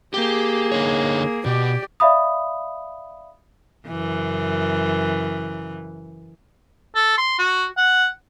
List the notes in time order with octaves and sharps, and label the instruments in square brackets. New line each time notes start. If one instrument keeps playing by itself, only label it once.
[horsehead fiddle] A#3 G#4 [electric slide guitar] G4
[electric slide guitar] D3 D#4 C#5
[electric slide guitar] B2 [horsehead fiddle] G4 D5
[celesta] D5 E5 F5 B5 D#6
[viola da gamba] F#2 C#3 E3
[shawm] A4
C6
F#4
F#5